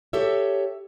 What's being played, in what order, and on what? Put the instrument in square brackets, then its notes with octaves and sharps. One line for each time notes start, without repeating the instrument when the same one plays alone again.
[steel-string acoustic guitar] G4 A4 C#5 E5